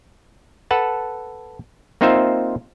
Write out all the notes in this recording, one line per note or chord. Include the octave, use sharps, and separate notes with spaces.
A4 B4 F#5 A5
A#3 C4 D#4 F4 C5 E5